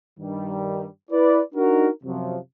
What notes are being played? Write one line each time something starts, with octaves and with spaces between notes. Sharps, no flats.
G2 D#3 G3
E4 B4 D5
D4 D#4 F#4 A#4
F#2 C3 F3 F#3